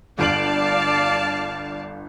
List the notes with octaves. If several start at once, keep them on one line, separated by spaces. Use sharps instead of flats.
G1 D5 F5 A5 D7 F#7